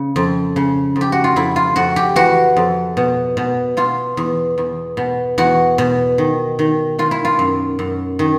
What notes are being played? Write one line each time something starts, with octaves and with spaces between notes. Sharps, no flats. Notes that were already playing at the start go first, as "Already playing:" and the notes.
Already playing: C#3
F2
C#3
F2
G4
F#4
F4
F2 E4
F4
F2 F#4
G4
E3 F#4
F2
B2
B2
B2 F4
E2
E2
B2
E2 F#4
B2
D#3
D#3
D#3 F4
E4
F4
F#2
F#2
D#3